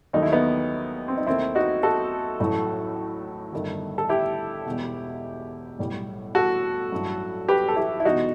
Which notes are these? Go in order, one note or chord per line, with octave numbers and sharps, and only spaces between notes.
D#2 D#3 F#3 A3 D#4
E4
B3 D#4
C4
D#4
D#2 D#3 A3 C4 E4
D#4 F#4
F#4 A4
A1 A2 F#3 A3
G1 G2 D#3 A3
A4
E4 G4
E1 E2 B2
B1 A2 G3
F#4 A4
A1 G2 F#3 A3
G4 B4
A4
E4 G4
E4
E1 E2 B2 D#4 F#4